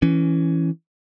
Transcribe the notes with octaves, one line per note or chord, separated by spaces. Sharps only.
E3 C#4